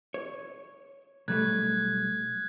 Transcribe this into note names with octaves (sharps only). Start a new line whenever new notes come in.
C#5
B1 G3 A3 F#6 G#6